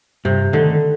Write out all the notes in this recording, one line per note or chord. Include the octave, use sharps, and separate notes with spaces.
G2 C3
D3 D#3 A3 D#4